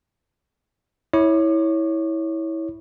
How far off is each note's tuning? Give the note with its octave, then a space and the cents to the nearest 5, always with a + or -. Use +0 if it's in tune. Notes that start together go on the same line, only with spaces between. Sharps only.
E4 -20 C#5 +0 D6 +35